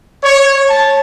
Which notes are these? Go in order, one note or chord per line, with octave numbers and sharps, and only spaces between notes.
C#5
A5